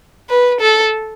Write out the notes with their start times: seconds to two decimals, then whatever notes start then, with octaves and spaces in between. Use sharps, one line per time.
0.30 B4
0.61 A4